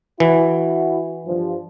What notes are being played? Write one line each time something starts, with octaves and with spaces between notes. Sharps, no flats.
E3 E4 F#4
G2 F3